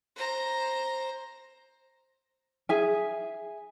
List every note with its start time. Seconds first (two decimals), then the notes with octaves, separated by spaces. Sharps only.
0.16 C5 A#5
2.69 G#4 E5 G#5